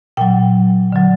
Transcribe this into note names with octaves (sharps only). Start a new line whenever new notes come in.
A#2 F#3 G5
D3 F#3